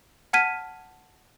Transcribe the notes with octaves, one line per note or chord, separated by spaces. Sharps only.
F#5 A5 F6 G#6 B6 D#7